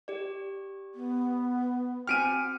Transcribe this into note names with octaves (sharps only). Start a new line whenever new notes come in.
G4 D5
B3
C4 F#4 G5 G#5 F6 D7 D#7